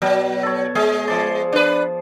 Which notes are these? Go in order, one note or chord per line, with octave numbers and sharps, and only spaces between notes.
B2 F#3
A4 C#5
G#3 G#4
F3 D5
D4 B4